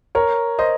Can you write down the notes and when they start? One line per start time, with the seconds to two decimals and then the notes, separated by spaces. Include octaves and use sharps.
0.15 A#4 C#5
0.59 C5 D#5